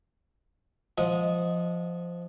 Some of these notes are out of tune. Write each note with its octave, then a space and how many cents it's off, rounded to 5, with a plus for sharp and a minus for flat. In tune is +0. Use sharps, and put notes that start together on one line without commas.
F3 -10 D#5 +0 F#5 -30